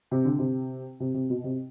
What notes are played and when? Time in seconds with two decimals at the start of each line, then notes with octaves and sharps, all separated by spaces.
0.11 C3
0.25 D3
0.39 C3
1.00 C3
1.14 C3
1.30 B2
1.44 C3